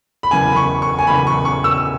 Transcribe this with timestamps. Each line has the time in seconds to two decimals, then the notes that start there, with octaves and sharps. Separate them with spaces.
0.23 B5
0.31 F#1 E2 C#3 G#5
0.52 B5
0.56 C#6
0.82 C#6
0.99 G#5
1.07 F#1 E2 C#3 B5
1.27 C#6
1.45 C#6
1.64 E6